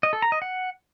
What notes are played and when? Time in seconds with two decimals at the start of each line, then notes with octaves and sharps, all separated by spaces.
0.03 D#5
0.13 A4
0.22 A#5
0.32 D#5
0.42 F#5